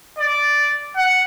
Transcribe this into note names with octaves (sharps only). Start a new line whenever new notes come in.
D5
F#5